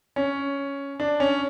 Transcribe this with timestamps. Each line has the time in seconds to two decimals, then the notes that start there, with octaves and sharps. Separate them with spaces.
0.16 C#4
1.00 D4
1.20 C#4